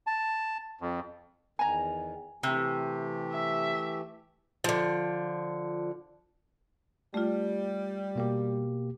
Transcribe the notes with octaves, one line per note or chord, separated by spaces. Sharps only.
A5
F2
E2 D#3 G#5 A#5
C3 E3 A3 G4
E5
D3 F3
G3 A3 F4
B2 A#3 G4